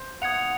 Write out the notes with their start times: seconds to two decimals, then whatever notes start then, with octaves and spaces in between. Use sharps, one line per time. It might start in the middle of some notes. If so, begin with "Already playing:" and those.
Already playing: C5
0.22 F#5 D#6 G#6 C#7 F7